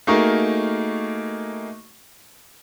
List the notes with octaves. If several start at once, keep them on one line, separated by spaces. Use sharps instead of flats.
A3 A#3 D#4 F#4 G#4 A#4